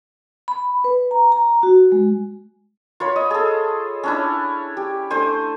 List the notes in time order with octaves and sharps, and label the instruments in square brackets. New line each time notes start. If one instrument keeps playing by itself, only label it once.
[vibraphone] B5
B4
A#5
A#5
F#4
G#3
[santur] F4 C#5 B5
D#5
G#4 A4
C#4 D4 E4
G4
A3 D4 C5 G#5